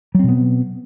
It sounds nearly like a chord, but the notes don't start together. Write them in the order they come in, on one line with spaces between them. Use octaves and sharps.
F#3 C4 B2 B3